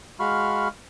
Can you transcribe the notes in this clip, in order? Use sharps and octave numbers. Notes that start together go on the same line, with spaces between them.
G#3 F#4 F5 B5 C#6 F6